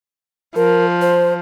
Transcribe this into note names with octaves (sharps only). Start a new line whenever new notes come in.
F3 A#4
C5